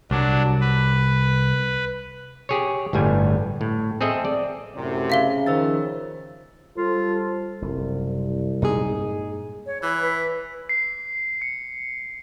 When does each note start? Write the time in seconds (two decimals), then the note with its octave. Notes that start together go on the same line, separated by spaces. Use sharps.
0.11 C2 F#3 D4
0.61 B4
2.49 G4 G#4 C#5
2.93 G1 A2 G3 G#5
3.61 A2
4.01 C4 G#4 A4 D#5 E5
4.25 D5
4.76 F#2 A2 C3
5.10 C#3 E5 F5 G7
5.46 D#3 F3 C5 E6 A6
6.77 G3 F4 A4 C5
7.62 F#1 C2
8.62 G2 A#2 G#3 D#4 G#4
9.66 C#5
9.83 E3 B5
10.02 B4
10.69 C7
11.42 C#7